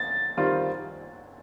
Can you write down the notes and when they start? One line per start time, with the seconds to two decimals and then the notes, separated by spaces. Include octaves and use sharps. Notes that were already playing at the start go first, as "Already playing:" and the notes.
Already playing: A6
0.37 D#3 G3 C4 F4